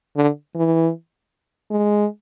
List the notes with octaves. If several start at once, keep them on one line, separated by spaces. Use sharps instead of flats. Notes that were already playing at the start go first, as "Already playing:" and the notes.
D3
E3
G#3